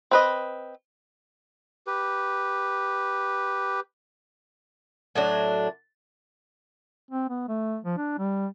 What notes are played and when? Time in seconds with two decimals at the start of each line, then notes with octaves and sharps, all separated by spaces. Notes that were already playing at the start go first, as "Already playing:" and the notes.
0.11 C4 B4 D#5
1.87 G4 B4
5.15 A2 F#3 D4
7.11 C4
7.29 B3
7.48 A3
7.84 F3
7.97 D4
8.18 G3